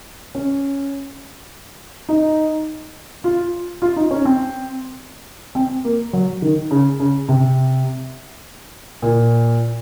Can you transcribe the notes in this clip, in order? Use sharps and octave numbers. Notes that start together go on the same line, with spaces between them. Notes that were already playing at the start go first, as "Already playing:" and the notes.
C#4
D#4
F4
F4
D#4
C#4
C4
C4
A#3
F#3
D#3
C#3
C#3
C3
A#2